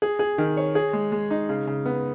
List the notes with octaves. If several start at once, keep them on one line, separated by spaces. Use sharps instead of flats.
G#4
G#4
D#3
C#5
G#4
G#3
G#3
D#4
C#3
C#3
B3